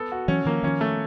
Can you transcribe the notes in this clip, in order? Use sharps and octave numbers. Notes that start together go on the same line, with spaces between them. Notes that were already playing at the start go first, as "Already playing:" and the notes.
Already playing: B3 A4
F#4
E3 F#3 C#4
D#3 F3 A#3
D#3 F3 C#4
A3